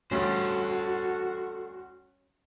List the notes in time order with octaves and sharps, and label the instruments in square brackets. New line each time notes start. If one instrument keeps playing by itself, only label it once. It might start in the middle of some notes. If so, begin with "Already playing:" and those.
[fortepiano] D2 G2 [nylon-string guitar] C#4 [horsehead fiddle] F#4 [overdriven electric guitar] A4 C5